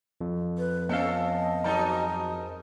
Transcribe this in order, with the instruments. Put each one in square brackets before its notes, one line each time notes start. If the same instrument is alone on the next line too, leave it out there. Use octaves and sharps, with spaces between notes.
[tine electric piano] F2
[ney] B4
[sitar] F3 C#4 A4 [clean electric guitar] B3 F5 [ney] D#5
[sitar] G#2 F#3 D#4 [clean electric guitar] A#4 A5